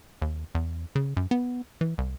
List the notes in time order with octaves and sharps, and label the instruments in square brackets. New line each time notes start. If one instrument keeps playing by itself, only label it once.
[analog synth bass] D#2
E2
C#3
F#2
B3
E3
C2